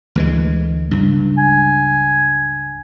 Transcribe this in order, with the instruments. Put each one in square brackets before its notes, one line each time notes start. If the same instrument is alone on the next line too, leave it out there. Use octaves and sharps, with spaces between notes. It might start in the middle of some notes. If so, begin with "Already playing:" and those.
[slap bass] D2 E3 G#3
C#2 G2
[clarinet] G#5